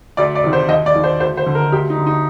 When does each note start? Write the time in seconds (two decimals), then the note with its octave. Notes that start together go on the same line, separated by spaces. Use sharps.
0.17 D2 D5
0.35 D5
0.44 C3 D#3
0.53 C5
0.69 D#2 D#5
0.86 D5
0.95 D#3
1.04 C5
1.20 D2 C5
1.37 C5
1.46 D3
1.55 A#4
1.72 D2 G4
1.90 D#4
1.98 D3
2.06 D#4